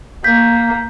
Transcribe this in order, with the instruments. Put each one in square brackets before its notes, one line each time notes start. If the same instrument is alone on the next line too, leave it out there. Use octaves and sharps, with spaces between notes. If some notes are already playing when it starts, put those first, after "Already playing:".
[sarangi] A#3 [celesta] G6 B6